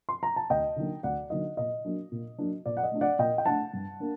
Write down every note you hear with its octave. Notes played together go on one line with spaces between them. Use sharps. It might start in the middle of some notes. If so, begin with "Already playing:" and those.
C6
A#5
A5
D2 D#5 G5
D3 F#3 A#3 D#4
D2 D5 F#5
D3 F#3 A#3 D#4 D#5
A#2 D#5
F#3 A#3 D4
A#2
F#3 A#3 D4
A#2 D5
F#5
D#5
A3 D4
D5 F#5
A#2 D#5 G5
G5
A3 D4 F#5 A5
G2
A#3 D4